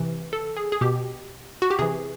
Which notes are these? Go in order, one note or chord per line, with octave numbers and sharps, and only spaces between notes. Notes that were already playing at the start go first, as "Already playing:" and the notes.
Already playing: C3 E3
A4
G#4
G#4
B2 G4
F#4
G4
C3 E3 G#4